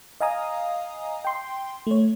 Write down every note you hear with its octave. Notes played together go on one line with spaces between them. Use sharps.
D#5 F5 G#5 A#5 D#6
G5 C6
A3 C#5